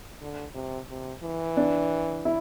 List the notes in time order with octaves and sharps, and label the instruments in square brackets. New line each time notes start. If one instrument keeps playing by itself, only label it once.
[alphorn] D3
C3
C3
E3
[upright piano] D4
E4